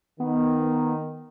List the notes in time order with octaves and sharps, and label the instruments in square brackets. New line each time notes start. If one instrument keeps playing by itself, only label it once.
[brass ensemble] D#3 [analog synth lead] B3